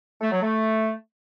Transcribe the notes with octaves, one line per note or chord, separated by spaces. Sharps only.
A3
F#3
A3